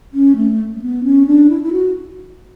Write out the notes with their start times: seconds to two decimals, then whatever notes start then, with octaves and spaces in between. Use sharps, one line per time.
0.14 C#4
0.36 A3
0.76 A3
0.82 B3
1.04 C#4
1.27 D4
1.50 E4
1.63 E4
1.73 F#4